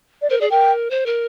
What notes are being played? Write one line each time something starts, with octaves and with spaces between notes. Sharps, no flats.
D5
A#4 C5
G#4 D5
A#4 G5
C5
A#4